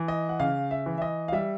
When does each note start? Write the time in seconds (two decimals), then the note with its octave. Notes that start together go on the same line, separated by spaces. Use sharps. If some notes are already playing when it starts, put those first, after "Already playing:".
Already playing: E3
0.08 D#5
0.29 F#5
0.40 C#3 F5
0.71 E5
0.86 E3
0.98 E5
1.02 D#5
1.28 F5
1.32 G3 E5